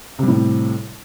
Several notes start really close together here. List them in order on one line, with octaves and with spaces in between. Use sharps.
C3 G3 A2